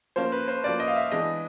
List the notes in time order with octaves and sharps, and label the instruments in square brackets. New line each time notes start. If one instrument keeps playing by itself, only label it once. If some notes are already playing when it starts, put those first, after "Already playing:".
[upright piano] F3 A#3 C#4 [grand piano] C5
[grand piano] B4
C5
[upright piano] F3 A#3 C#4 [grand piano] D5
[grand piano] D#5
F5
E5
[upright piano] E3 G#3 B3 D4 [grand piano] D#5